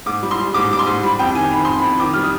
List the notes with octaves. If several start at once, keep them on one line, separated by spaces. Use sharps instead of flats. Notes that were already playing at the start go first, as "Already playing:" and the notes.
G#2 D6
G3
C6
G3
G#2 D6
G3 D6
C6
G#2
G3 B5
F2 G5
D#3 G#5
D#3 B5
F2 C6
B5
F2
D#3 D6
G3 F6
D#6